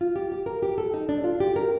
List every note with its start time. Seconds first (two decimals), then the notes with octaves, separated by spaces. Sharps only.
0.01 F4
0.16 G4
0.32 G4
0.46 A#4
0.63 G4
0.78 A4
0.94 D#4
1.09 D4
1.24 F4
1.40 G4
1.56 A#4